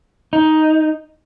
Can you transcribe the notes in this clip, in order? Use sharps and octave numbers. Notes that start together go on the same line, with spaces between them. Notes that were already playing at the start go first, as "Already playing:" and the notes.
D#4